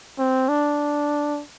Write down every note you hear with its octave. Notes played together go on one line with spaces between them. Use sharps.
C4
D4